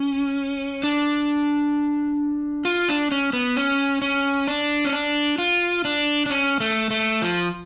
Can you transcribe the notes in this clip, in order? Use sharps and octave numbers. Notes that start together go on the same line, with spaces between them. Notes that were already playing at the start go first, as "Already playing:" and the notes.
Already playing: C#4
D4
F4
D4
C#4
B3
C#4
C#4
D4
C#4
D4
F4
D4
D4
C#4
A3
A3
F3